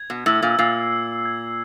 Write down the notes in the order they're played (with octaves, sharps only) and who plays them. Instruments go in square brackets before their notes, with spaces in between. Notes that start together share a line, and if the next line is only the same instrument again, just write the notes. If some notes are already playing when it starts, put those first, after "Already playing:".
Already playing: [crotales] G#6
[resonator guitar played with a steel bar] B2
[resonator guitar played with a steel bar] A2 [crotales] E6
[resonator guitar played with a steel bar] A#2
[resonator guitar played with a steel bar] A#2 [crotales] C7
[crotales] E6
G#6